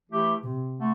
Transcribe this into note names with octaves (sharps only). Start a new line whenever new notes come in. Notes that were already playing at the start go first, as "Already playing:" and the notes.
E3 A3 E4 G4
C3
D3 A3